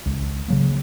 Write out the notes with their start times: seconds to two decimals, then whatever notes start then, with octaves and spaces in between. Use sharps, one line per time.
0.06 C#2
0.48 C#3 F#3 A#3